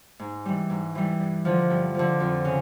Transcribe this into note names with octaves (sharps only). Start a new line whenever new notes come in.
G#2
E3 G3
G#2
E3 G3
G2
D3 F3
G2
D3 F3
F2
C#3